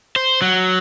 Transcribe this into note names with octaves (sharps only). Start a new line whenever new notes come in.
C5
F#3